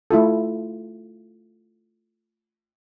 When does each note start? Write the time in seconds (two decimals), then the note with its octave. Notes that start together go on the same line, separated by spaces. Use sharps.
0.11 A3 E4 F4 A4